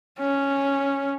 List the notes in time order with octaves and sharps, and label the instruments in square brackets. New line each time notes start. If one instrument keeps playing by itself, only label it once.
[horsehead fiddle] C#4